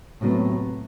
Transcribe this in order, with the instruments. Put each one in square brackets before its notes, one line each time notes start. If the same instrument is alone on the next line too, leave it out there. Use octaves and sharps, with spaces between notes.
[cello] A2 [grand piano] C3 F#3 B3